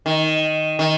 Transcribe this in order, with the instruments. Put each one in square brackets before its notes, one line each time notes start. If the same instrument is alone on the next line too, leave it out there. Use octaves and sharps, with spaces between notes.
[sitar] D#3
D#3